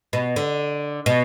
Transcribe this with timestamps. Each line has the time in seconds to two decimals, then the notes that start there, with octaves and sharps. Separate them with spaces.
0.13 B2
0.36 D3
1.06 B2